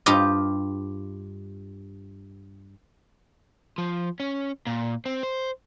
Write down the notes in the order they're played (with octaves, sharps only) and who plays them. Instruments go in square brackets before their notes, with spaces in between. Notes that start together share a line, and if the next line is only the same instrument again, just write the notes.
[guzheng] G2 F4 G4 D#5
[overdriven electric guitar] F3
C#4
A#2
C4
C5